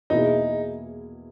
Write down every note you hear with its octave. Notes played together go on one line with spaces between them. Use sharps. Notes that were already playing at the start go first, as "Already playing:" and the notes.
E2 B2 A#3 D#4 E4 G#4